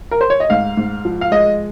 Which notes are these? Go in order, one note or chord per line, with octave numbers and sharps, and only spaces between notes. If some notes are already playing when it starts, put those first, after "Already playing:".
A#4
C5
C#5
D#5
G#2 F5
G#2
F3
F5
G#3 D#5